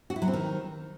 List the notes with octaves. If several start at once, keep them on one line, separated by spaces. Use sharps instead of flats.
F#4
E4
F#3
C4
D#3